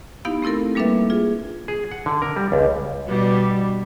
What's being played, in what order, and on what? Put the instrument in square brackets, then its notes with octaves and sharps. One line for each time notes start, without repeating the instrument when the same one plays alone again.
[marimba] B3 D#4 E4 G4 F5
A3 C4 E4 A4 A#4
G3 A#3 D4 A4 B4 E5
F4 G#4
[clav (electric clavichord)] G#4
F#5
D3
A#4
G3
C#2
[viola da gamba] B2 G3 D4